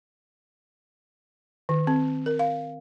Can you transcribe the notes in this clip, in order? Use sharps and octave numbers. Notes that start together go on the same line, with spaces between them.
D#3
C4
A#4
F5